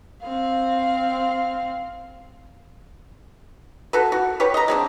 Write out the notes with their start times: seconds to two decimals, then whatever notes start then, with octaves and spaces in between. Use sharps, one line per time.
0.23 C4 F5
3.93 F#4 A4 B4
4.12 F#4
4.40 G4 B4 C#5
4.54 D#5 A#5
4.68 G#3 C4 D4